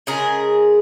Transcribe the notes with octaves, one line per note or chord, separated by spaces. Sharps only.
C#3 G#3 G#4 A#4